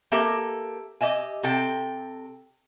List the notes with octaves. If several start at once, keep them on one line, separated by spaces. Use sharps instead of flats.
A#3 G4 A4 A#4 E5
G4 D#5 E5 G#5
C3 A4 G5